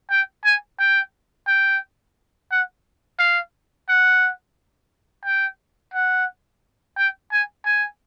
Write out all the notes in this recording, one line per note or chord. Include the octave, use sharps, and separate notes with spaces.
G5
G#5
G5
G5
F#5
F5
F#5
G5
F#5
G5
G#5
G#5